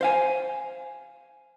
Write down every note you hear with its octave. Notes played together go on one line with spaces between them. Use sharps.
C5 F5 G#5